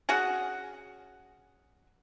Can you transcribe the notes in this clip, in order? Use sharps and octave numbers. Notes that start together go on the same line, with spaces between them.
C#4 F#4 G#4 F#5